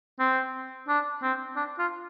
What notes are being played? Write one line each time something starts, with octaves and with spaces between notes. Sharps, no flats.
C4
D4
C4
D4
F4